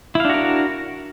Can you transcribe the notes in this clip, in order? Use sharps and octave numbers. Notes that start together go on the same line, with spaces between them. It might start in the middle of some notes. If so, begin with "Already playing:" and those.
D4 E4 F#4 A#4 F5